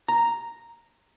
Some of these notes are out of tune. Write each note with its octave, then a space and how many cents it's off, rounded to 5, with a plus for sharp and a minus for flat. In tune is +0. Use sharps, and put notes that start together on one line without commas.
A#5 +0